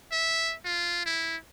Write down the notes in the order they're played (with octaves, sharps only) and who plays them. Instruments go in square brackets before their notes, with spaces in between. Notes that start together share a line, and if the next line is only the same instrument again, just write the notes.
[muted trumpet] E5
F4
E4